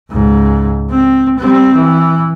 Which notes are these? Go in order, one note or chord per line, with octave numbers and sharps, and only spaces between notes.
C#2 G#2
C4
G3 C4
E3